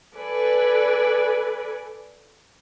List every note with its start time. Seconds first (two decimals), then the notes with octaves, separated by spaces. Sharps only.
0.14 A4 B4 D5 G#5